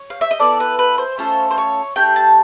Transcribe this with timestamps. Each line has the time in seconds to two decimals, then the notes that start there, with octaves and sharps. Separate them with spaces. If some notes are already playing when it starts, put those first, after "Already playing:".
Already playing: C#5
0.10 F5
0.21 E5
0.31 D#5
0.39 B3 E4 A4 D5
0.60 B4
0.79 B4
0.98 C5
1.18 A3 C#4 F4 A4 C5
1.51 C5
1.58 C#5
1.96 A3 D4 G4 G5
2.16 A5